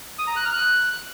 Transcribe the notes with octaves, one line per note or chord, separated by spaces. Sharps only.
D#6
A#5
F#6
F6
F#6